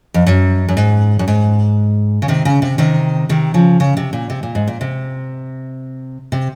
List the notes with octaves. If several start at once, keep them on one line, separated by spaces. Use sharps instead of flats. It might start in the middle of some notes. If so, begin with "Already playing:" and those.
F2
F#2
F#2
G#2
F#2
G#2
C#3
C3 D#3
C#3
C3
C3 D#3
C3 D#3
C#3 F3
C#3
C3
A#2
C3
A#2
G#2
A#2
C3
C3